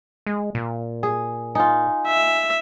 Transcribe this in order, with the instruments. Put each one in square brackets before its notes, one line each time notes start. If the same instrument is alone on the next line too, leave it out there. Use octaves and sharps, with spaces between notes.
[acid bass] G#3
A#2
[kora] G#4
[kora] D#4 F4 [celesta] G#5
[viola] E5